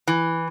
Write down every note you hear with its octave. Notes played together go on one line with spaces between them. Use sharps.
E3